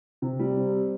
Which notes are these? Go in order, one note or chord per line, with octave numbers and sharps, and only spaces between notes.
C3
G3
C4